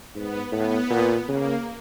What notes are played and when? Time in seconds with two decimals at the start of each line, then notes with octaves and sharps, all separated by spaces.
0.14 G#2 B3
0.52 A2 B3
0.90 A#2
1.28 C#3 A#3